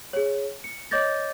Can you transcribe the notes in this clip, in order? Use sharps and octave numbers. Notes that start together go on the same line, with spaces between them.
G#4 C#5
C#7
C#5 D#5 D6 G6 A6 A#6